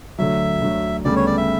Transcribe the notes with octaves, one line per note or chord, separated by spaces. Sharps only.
D2 D3 F#3 E5
D2 D3 F#3
D2 C#3 G3 B3 D5
C#5
D5
E5